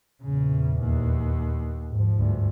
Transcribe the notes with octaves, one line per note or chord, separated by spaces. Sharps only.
A#1 E2 C#3
D#2
G#2 F3
D2 G2